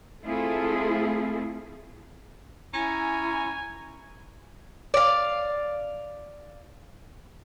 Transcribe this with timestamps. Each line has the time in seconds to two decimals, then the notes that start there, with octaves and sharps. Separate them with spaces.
0.25 A3 C4 E4 F4 G#4 A4
2.74 C#4 E4 G#5 A#5
4.94 D5 F5